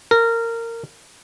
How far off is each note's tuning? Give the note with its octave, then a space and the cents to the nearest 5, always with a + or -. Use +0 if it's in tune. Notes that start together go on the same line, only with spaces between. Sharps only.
A#4 -20